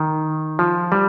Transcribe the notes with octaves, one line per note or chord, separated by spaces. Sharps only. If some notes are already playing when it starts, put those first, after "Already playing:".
Already playing: D#3
F3
G3